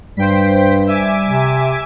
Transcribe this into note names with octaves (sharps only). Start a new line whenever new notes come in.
G2 G3 C5 G5 B6
E5 G#5 D6
C3